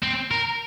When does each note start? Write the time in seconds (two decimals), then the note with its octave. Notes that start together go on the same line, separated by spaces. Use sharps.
0.03 C4
0.31 A#4